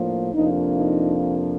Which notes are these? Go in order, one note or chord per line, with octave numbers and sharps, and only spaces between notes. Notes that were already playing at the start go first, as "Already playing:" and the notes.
Already playing: A2 F3 A#3 D4
F2 C3 F3 A#3 D4 D#4
D#4